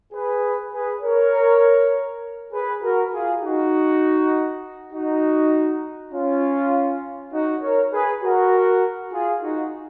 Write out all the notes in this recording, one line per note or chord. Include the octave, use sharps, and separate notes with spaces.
G#4 B4
G#4 B4
A#4 C#5
G#4 B4
F#4 A#4
F4 G#4
D#4 F#4
D#4 F#4
C#4 F4
D#4 F#4
A#4 C#5
G#4 B4
F#4 A#4
F4 G#4
D#4 F#4